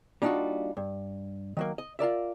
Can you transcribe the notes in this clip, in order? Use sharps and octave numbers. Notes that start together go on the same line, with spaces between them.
G3 A#3 D4 D#4 F4 F#4
G2
D#3 F#3 A#3
D#5
F4 A#4 D5 E5